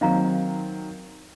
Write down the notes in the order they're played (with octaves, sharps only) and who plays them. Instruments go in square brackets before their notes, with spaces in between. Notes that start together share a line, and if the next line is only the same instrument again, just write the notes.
[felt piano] D#3 F#3 C4 [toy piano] D#5 F5 A#5